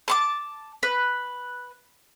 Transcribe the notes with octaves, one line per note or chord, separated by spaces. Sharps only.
A5 C6 D6
B4